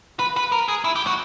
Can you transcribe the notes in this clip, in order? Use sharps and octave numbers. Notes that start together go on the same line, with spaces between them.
B4
B4
A#4
G#4
E4
G4
F#4